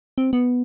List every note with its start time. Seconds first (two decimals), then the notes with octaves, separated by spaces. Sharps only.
0.18 C4
0.33 B3